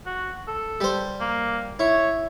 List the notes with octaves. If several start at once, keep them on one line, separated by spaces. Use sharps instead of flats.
F#4
A4
G3 C5
A#3
E4 C#5